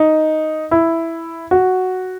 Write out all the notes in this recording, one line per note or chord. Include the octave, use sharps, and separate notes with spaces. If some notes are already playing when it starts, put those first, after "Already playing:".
Already playing: D#4
E4
F#4